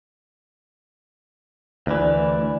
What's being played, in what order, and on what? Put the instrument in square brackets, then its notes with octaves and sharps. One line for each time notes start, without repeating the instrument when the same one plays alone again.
[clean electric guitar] D2 E3 [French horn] D5